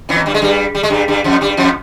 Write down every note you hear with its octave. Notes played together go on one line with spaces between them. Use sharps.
E2 E3
G2 G3
G#3
G2 G3
G3
G#3
G2 G3
G2 G3
F2 F3
G2 G3
F2 F3